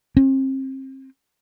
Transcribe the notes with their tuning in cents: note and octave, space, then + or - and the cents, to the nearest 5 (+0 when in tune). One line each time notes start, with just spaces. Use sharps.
C4 +35